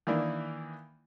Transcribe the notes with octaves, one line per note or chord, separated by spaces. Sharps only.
D#3 E3 A#3 D4 E4